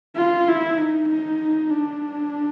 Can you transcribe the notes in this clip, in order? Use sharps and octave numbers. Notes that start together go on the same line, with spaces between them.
F4
E4
D#4
D#4
D4